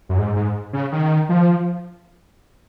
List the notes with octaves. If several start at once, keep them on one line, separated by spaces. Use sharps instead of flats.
F#2
G#2
G#2
C#3
D#3
F3